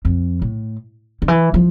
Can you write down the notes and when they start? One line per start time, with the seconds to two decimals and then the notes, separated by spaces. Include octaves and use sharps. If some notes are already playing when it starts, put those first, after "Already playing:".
0.05 F2
0.42 A2
1.22 D3
1.28 E3
1.54 F3